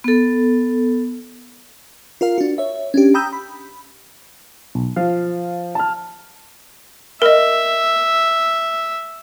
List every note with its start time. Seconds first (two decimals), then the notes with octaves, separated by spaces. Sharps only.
0.04 B3 A4
2.21 F4 A#4 F5
2.38 D4 F#4
2.58 C#5 E5
2.94 C#4 D4 G4
3.14 G5 A#5 B5 D#6 E6 G6
3.33 B5
4.75 B1
4.96 F3 F5
5.75 A5 F6
7.22 A#4 D#5 E5